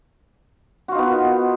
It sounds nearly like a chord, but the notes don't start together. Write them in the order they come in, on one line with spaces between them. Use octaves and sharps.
F#4 F4 D#4 B3